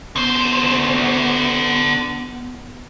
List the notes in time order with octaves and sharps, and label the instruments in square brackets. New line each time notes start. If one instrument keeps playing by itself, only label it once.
[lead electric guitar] D3 C5 [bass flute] B3